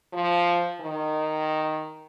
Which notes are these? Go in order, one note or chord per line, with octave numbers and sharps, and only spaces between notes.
F3
D#3